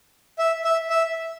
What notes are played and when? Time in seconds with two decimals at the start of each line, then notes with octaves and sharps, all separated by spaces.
0.39 E5
0.64 E5
0.90 E5